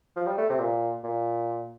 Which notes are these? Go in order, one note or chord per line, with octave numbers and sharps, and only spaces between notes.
F3
G3
A3
C3
A#2
A#2